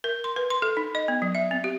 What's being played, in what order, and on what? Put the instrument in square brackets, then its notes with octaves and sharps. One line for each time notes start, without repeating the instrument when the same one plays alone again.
[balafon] A#4
C6
B4
C6
A4
D#4
D#5
B3
F#3
E5
C4
G4